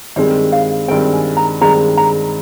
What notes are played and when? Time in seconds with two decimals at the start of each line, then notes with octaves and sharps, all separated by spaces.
0.16 G2 D#3 G#3 C4 C5
0.52 F5
0.88 G2 D#3 G#3 C4 G5
1.13 G#5
1.37 A#5
1.61 G2 D#3 G#3 C4 A#5
1.97 A#5